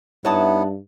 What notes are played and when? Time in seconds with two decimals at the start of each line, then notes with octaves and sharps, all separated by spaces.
0.25 G2 B3 D#4 E4 C#5 F#5 A5 D#6